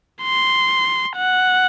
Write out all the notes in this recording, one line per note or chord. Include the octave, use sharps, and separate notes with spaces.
C6
F#5